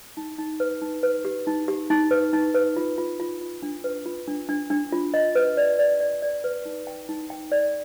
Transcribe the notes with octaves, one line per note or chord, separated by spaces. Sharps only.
D#4
D#4
B4
D#4
B4
G4
D#4
G4
D#4
B4
D#4
B4
F4
F4
F4
F4
D4
B4
F4
D4
D4
D4
F4
D#5
B4
D5
D5
D5
D5
B4
D#4
G5
D#4
G5
D5